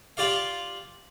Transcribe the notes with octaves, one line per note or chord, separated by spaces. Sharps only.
F4 G4 D5 F5